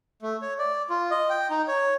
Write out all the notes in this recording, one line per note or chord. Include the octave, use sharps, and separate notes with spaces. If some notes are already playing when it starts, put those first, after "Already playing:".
A3
C#5
D5
F4
D#5
G5
D#4
C#5